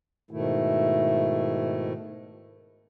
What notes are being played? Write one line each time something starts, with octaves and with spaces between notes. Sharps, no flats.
G#2 B2 D#3 A3 E4